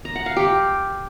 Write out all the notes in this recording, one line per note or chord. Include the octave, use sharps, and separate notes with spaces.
A#5
F#5
F5
G4